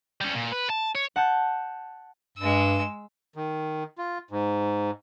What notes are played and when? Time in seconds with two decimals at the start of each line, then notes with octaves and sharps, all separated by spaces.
0.21 G3 C#4
0.35 A#2
0.52 B4
0.70 A5
0.95 C#5
1.16 F#5 A5 G6
2.38 G2 G#3 E6
3.36 D#3
3.98 F4
4.31 G#2